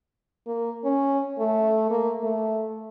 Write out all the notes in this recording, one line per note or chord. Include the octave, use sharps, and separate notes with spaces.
A#3
C#4
A3
A#3
A3